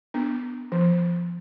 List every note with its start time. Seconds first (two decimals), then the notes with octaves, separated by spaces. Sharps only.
0.14 B3 D4
0.72 F3